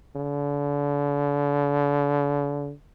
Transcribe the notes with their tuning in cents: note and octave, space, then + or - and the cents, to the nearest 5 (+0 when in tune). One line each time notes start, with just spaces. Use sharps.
D3 -35